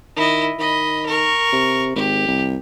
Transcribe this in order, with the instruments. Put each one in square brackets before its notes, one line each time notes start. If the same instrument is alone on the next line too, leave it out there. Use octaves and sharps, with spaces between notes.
[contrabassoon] D#3 [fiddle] E4 D#5
[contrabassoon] D#3 [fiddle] D#5 B5
[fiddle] A#4 C#6
[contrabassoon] C3
[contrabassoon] G#1 [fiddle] G4
[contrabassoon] C2